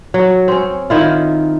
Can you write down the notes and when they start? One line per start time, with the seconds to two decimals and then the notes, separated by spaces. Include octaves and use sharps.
0.14 F#3
0.48 C4 C#4
0.90 D#3 E4 F4